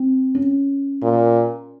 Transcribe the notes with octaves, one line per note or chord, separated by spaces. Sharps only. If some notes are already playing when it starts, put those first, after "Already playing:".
Already playing: C4
C#4
A#2